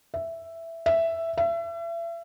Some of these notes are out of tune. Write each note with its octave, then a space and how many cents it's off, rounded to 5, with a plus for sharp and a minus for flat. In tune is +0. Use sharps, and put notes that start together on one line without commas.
E5 +5
E5 +5
E5 +35